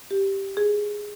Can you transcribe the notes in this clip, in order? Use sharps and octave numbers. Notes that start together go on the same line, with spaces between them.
G4
G#4